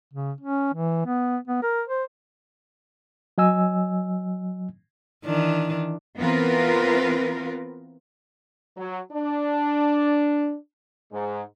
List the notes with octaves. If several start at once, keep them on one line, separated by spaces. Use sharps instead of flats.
C#3
C#4
E3
B3
B3
A#4
C5
F#3 D#5 G#5 E6
D#3 E3 D4
E3 B3 C4 F4 A#4 B4
F#3
D4
G#2